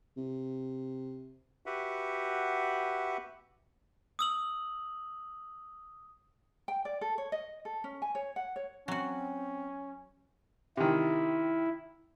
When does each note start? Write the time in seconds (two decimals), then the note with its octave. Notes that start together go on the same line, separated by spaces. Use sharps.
0.17 C3
1.66 F#4 G4 B4 E5 F#5
4.19 D#6 E6 F#7
6.68 G5
6.85 D5
7.01 A4
7.18 C#5
7.32 D#5
7.65 A4
7.84 C#4
8.02 G#5
8.15 C#5
8.36 F#5
8.56 C#5
8.88 F#3 C4 C#4 F#4
10.77 C3 D#3 E4